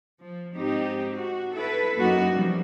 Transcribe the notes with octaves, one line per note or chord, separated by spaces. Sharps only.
F3
G#2 C4 D#4 G4
F#4
E4 A4 B4
F#2 A#3 D#4 F#4
C3 F3 G3 A#3